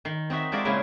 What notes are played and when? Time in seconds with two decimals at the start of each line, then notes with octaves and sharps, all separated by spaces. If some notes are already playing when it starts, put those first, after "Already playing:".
0.05 D#3
0.30 C4 D#4 F#4 E5
0.52 F3 G#3 F#4 A#4 D5 E5
0.65 A#2 C#3 G#3 E4